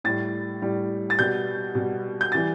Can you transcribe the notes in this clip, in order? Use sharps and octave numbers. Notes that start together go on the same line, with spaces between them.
A2 G3 A6
A2 G3
A6
B2 G3 G6
B2 G3
G6
E3 G3 A6